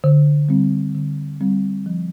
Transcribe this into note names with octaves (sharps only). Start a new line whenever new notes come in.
D3
G3 C4
D3
G3 C4
F3